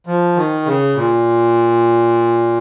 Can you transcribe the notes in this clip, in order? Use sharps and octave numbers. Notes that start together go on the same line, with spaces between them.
F3
D#3
C#3
A#2